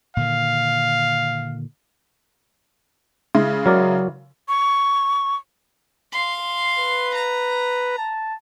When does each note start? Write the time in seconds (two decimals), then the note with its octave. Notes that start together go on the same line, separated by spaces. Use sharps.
0.17 A#2 D3 D#3 F5
3.35 C#3 G#3 E4
3.66 F#3 A#4 D5
4.48 C#6
6.12 F5 C6
6.78 B4
7.15 A#5
7.98 A5